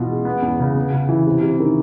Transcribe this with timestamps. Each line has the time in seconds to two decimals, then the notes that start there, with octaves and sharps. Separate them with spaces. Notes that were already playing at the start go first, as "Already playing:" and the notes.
Already playing: B2 E3 F4
0.09 G#3
0.25 B3
0.42 E2
0.60 C#3
0.75 B3
0.92 C#3
1.09 E3
1.26 C3
1.43 C3
1.59 D#3